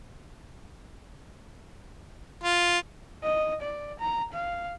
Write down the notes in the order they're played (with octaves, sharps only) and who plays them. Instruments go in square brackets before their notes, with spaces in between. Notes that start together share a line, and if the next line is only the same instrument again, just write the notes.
[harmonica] F4
[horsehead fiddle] D#5
D5
A#5
F5